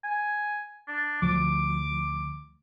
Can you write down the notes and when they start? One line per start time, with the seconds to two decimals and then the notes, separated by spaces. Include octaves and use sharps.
0.04 G#5
0.87 D4
1.22 D2 F3 D6